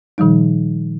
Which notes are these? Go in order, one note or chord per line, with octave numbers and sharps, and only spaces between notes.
A#2 D#3 F3 G3 D#4